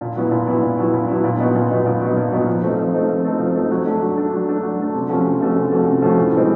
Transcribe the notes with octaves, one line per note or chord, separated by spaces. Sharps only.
A#2
F#3 B3 E4
A#2
F#3 B3 E4
A#2
F#3 B3 E4
A#2
F#3 B3 E4
A#2
F#3 B3 D#4
A#2
F#3 B3 D#4
A#2
F#3 B3 D#4
A#2
F#3 B3 D#4
F3
A3 C4 D#4
F3
A3 C4 D#4
F3
A3 C4 D#4
F3
A3 C4 D#4
F#3
A3 D4
F#3
A3 D4
F#3
A3 D4
F#3
A3 D4
C3
F3 A3 C#4 F#4
C3
F3 A3 C#4 F#4
C3
F3 A3 C#4 F#4
C3
F3 A3 C#4 F#4
A2
E3 G#3 C4